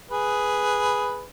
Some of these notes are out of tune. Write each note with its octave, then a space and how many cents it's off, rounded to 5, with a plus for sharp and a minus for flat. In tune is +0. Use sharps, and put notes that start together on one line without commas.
G#4 +0 B4 +0